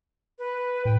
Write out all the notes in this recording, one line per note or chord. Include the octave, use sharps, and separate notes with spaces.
B4
A2 G5